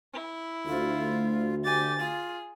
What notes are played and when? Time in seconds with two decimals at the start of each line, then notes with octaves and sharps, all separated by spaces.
0.13 E4
0.66 D2 F4
1.64 G4 G#5 A6
1.98 F4 G#4